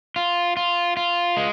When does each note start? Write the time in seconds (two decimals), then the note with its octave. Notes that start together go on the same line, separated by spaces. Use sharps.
0.16 F4
0.57 F4
0.97 F4
1.37 G#3